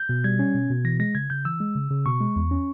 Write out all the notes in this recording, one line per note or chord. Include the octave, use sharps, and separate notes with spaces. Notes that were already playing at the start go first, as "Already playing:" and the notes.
Already playing: G6
B2
G3 G#6
C#4
B2
B2
E3 A#6
G#3 A#6
C#3 G#6
C#3 G6
E3 E6
G#3
C#3
C#3
B2 C#6
G#3
E2
C#4